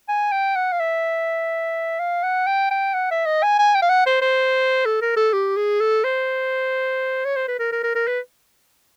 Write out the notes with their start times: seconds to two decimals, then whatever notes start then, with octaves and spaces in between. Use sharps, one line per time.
0.09 G#5
0.32 G5
0.56 F#5
0.72 F5
0.80 E5
1.99 F5
2.23 F#5
2.47 G5
2.71 G5
2.94 F#5
3.11 E5
3.26 D#5
3.43 G#5
3.59 G#5
3.75 G5
3.82 F5
3.89 F#5
4.06 C5
4.21 C5
4.86 A4
5.02 A#4
5.17 A4
5.33 G4
5.56 G#4
5.80 A4
6.04 C5
7.25 C#5
7.36 C5
7.48 B4
7.59 A#4
7.72 A#4
7.83 A#4
7.95 A#4
8.07 B4